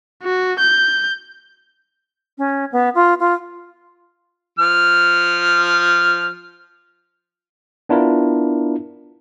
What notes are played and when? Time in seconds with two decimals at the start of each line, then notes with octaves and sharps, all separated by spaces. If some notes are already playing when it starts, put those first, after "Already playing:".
0.23 F#4
0.59 G6
2.38 C#4
2.72 B3
2.95 F4
3.20 F4
4.59 F3 F6
7.89 B3 D4 E4 F4 A#4